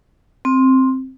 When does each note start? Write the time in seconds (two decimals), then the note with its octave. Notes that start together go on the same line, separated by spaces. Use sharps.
0.45 C4